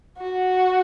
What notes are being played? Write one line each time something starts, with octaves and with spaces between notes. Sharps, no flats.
F#4